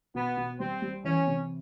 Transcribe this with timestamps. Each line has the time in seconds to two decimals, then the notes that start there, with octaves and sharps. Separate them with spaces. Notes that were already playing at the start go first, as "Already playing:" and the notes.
0.15 B2 B3
0.37 B2
0.59 G3 C4
0.82 G3
1.04 E3 C#4
1.27 C3